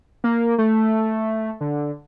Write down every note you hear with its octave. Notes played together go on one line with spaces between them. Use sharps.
A#3
A3
D3